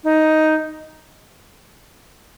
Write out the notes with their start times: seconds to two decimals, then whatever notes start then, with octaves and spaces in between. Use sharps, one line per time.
0.04 D#4